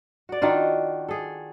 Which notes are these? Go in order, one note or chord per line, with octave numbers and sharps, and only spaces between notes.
F#4 D5
D#3 D4 F4 F#4
G#4 A4